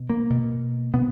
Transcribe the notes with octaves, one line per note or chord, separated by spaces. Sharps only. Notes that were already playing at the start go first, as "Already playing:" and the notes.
Already playing: B2
A#3
B2
B2 B3